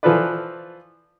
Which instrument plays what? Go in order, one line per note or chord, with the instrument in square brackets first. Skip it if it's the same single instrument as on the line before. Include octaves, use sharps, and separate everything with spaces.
[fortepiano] E3 F3 F4 A4 B4 D5